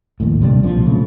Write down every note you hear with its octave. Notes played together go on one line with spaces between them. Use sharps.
A#1 D#2 A2
C3 G3 G#3 D4
B1 A#2 F3 C4
C#3 A3